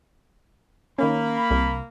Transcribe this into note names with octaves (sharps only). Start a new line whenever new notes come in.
D#3 A#3 C#4 B5
C2